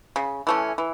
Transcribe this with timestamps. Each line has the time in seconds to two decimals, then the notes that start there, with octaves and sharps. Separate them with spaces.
0.16 C#3
0.47 E3 A3 C#4
0.78 E3